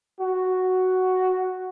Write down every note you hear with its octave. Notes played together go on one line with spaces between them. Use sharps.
F#4